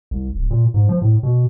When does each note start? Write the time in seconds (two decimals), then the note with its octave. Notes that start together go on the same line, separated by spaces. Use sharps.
0.11 C2
0.36 D1
0.51 A#2
0.74 G#2
0.89 F3
1.02 A2
1.23 B2